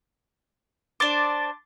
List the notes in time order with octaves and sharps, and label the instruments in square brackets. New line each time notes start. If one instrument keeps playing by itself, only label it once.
[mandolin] D4 C5 [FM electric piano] D6 A6